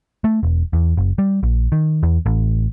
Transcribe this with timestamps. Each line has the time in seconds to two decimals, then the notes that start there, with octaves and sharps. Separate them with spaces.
0.24 A3
0.43 E1
0.73 E2
0.97 F#1
1.18 G3
1.43 A#1
1.72 D#3
2.03 E2
2.26 A1